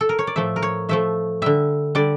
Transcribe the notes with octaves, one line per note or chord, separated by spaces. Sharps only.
A4
A#4
C#5
D5
A2 F3 A3 E5
A#4
C#5
A2 F3 A3 E5
D3 G3 E5
D3 G3 D5